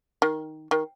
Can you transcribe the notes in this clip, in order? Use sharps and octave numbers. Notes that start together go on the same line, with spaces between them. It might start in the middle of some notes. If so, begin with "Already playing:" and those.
D#3
D#3